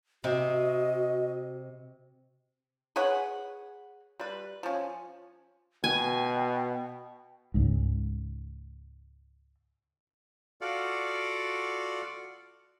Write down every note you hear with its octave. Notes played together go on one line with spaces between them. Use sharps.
C3 F#4 D#5
G#4 B4 C#5 F#5
G3 B4
F3 C#4
B2 G5 G#5
C#2 G#2
F4 F#4 A4 D5 F5 F#5